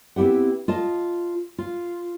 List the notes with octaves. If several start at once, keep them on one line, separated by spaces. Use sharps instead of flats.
B3 C4 E4 G4 F#5
F4 D#5 A5
F4